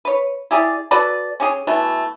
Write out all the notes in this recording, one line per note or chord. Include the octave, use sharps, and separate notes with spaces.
B4 C#5
E4 G4 G#4 D5
F#4 A4 B4 D5
C#4 G4 G#4
B2 E3 A3